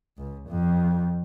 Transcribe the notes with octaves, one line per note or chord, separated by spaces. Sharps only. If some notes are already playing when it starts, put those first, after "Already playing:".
C#2
F2